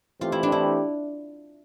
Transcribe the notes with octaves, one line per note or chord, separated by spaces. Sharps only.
E3 A3 C4 F4 G4
E4
D4
E4